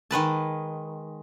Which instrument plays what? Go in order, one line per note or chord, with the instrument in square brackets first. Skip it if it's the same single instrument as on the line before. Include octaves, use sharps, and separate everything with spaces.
[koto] D#3 G#3 B4 A5